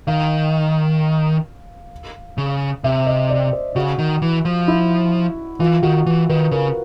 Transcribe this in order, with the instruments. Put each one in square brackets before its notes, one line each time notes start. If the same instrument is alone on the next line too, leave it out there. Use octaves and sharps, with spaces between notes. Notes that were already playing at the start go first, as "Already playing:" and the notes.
[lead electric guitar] D#3 [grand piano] F5
[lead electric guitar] C#3
[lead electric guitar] C3 [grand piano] E5
[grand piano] D#5
D5
C5
[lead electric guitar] C#3 [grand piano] F#4
[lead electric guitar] D#3
E3
F3
[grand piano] E4
[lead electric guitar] E3 [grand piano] F4
[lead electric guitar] D#3 [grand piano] F#4
[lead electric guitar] E3
[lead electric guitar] D#3 [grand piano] B4
[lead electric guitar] C#3 [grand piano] A#4